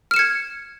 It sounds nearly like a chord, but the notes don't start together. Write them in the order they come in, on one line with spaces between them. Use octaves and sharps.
F6 E7 C#7 G#6